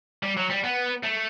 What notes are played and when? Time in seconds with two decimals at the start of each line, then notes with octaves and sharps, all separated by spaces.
0.23 G3
0.37 F#3
0.50 G3
0.64 B3
1.03 A3